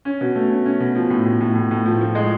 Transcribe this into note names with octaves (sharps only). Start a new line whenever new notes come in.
C#4
B2
A3
C#4
C#4
B2
F3
A2
A2
A2
A2
A2
F3
F3
G#3